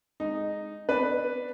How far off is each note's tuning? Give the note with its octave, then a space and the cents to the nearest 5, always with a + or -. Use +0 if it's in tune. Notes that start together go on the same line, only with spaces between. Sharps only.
G#3 +0 D#4 -10
B3 +30 D4 +0 B4 +0